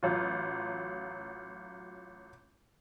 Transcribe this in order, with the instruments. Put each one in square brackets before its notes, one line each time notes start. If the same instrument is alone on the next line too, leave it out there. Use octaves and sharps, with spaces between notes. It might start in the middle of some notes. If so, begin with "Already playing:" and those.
[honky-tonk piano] A1 F#3 F4